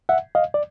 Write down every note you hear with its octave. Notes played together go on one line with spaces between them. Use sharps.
E5 F#5
D#5 F5
D5